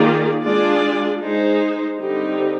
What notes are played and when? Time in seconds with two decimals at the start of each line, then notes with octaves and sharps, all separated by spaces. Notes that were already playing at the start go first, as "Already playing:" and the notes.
Already playing: D#3 A#3 F4 G#4 D5
0.43 G#3 D4 F4 G#4 D5
1.22 G#3 D#4 G#4 C5
2.01 D3 G3 C4 D#4 G4